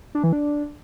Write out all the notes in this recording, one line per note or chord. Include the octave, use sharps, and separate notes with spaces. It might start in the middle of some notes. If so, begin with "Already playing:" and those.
D4
E3
D4